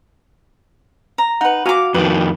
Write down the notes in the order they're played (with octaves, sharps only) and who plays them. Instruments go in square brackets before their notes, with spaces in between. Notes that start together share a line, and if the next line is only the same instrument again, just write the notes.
[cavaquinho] A#5
[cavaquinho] D#4 B4 [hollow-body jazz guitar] F#5
[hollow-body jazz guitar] F#4 G#5 A#5 [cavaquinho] F5 D6
[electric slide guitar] F2 D#3 [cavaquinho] B4